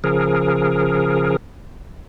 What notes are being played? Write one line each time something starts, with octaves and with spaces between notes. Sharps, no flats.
C#3 F3 G#4 A#4